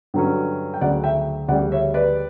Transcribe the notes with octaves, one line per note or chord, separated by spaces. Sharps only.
G2 D3 F#3 C#4
G5
D2 C#3 F#3 D5 F#5
E5 G5
D2 C#3 G3 D5 F#5
C#5 E5
B4 D5